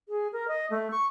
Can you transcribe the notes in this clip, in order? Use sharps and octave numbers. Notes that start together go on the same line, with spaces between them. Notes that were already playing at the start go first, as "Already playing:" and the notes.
G#4
A#4
D#5
A3
C#6